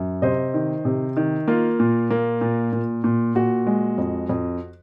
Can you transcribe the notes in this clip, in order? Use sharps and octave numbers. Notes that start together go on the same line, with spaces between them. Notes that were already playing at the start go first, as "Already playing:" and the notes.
Already playing: F#2
C3 C5 D#5
D#3
C3
D#3
A#3 F4
A#2
A#3
A#2
A#2
A#2
A#2 F#4
G#3
F2
F2